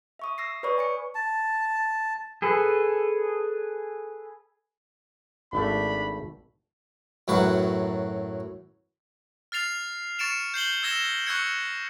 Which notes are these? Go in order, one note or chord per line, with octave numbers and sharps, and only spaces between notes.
E5 C#6 D#6
E6 A#6 C7
B4 C#5 D5 B5 C#6 D#6
G#5 C#6 C#7
A5
G#4 A4 B4
G#1 A3 D4 B5
F#2 A2 F#3 B4 F#5 C#6
F6 A6 C7 F7
C#6 A6 C#7 D7 E7 F7
G6 C7 F#7 G7
E6 G#6 A#6 E7 G7
C#6 E6 F#6 G#6 C#7